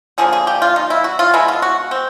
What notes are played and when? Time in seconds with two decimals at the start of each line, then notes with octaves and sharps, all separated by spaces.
0.18 D3 F3 A#3 G#4
0.32 G#4
0.47 G4
0.62 F4
0.76 D#4
0.90 E4
1.04 F#4
1.19 F4
1.34 B2 G#3 B3 E4
1.48 F4
1.62 F#4
1.91 C4